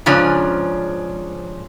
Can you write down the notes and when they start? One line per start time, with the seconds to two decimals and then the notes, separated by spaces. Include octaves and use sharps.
0.06 G#2 C#3 F3 C#4 D4